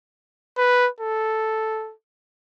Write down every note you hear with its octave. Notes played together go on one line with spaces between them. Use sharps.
B4
A4